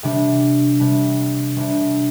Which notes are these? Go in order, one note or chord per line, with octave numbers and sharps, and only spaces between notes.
C3 G3 D4
C3 G3 D4
C3 G3 D4